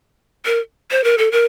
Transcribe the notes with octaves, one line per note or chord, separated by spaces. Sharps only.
A#4
C5
A#4
A4
A#4